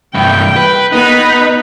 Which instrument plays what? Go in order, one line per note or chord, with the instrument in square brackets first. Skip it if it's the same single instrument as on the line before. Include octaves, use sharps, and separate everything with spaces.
[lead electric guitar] C2 G2 [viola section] G5
[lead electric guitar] B4
[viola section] B3 B4 B5 [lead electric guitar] D#4